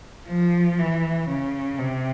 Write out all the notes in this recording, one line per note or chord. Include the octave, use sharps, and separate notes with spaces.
F3
E3
C#3
C3